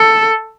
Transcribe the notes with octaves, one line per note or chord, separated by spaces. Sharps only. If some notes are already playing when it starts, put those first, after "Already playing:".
Already playing: A4